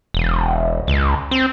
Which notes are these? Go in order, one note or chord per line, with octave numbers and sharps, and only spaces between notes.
E1
C#2
C4